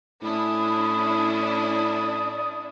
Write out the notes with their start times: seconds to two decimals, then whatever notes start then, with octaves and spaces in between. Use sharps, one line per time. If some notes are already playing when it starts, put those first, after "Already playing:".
0.23 A2 C#4 D4 E4 B5 D#6
1.38 D5